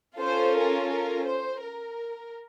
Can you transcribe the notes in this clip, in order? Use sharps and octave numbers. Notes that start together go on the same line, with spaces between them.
C#4 F4 A4 C5
A#4
A#4
C5
A#4